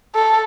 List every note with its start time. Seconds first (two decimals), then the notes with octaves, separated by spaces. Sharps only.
0.15 A4